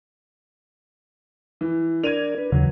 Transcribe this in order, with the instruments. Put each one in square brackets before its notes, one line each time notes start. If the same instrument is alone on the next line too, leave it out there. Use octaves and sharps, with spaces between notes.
[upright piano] E3
[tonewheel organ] D4 A#4 D5 [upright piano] G#6 D#7 F7
[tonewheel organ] D4 B4
[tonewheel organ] D#2 [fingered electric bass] C#3 E3 [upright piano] F#3